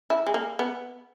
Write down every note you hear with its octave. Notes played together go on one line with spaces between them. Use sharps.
E4
G#3
A#3
B3